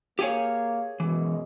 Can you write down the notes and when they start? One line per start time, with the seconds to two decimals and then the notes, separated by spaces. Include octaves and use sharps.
0.19 A#3 G4 G#4 C#5 F5
1.00 F#2 B2 E3 G#3